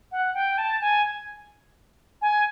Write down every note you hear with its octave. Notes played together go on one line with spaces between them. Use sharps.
F#5
G5
A5
G#5
G#5